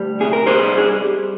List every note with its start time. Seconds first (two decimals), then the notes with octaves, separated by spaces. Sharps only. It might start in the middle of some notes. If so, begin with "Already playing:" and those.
Already playing: D2 G3
0.20 C3 G#4
0.33 A#4
0.46 G3 G#4 C5
0.78 G#4